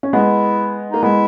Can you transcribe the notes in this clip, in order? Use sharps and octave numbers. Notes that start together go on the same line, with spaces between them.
C#4
G#3 B3 E4
A#3 D#4
G#3 B3 E4